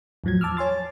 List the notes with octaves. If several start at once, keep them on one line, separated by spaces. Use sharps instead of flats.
E2 A2 F3 F#3 G#6
A5 D6 E6 F6
C#5 G#5 C6 A6